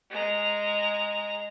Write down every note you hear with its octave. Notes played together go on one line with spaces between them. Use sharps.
G#3 A#5